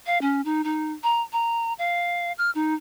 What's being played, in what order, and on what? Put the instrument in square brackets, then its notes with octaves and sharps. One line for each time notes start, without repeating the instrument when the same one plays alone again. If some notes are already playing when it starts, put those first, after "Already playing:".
[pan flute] F5
C#4
D#4
D#4
A#5
A#5
F5
F6
D#4